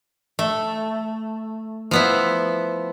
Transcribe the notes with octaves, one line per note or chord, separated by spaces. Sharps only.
A3
F3 B3 E4